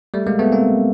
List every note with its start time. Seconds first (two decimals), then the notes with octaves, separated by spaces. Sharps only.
0.14 G3 A3
0.27 G#3 A#3
0.39 A3 B3
0.52 A#3 C4